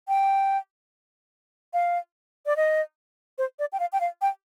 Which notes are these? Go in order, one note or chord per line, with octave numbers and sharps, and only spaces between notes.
G5
F5
D5
D#5
C5
D5
G5
F5
G5
F5
G5